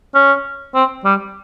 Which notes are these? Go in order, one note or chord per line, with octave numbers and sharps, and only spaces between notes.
C#4
C4
G3